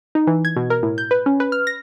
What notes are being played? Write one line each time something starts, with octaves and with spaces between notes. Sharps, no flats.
D#4
E3
G#6
B2
A#4
A2
G6
B4
C#4
B4
F6
A#6